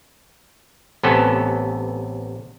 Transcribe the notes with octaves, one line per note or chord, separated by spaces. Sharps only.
A1 C3 B3 C#4 A4